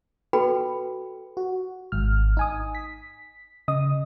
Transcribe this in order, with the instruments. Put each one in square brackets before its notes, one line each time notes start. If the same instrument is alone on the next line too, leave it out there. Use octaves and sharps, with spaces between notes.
[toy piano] F#4 A4 B4 G5 B5
[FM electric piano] F#4
G#1 G#2 F6
D#4 G#5 D#6
B6
C#3 D#5 D#6